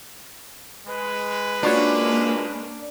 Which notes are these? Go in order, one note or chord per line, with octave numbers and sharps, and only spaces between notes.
G#3 B4
A#3 C#4 D4 F4 F#4 C#5